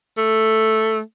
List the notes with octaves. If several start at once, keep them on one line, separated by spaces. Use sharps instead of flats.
A3